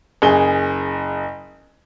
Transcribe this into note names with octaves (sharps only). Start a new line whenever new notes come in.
F#1 G#4 G7